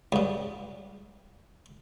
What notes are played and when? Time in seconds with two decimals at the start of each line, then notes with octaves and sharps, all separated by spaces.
0.12 C#2 G2